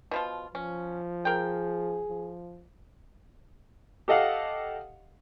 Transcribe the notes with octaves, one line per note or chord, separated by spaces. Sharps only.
B2 F3 F4
F3 C#4
G#4 A#4 G5
F3
G4 A4 D#5 F5 F#5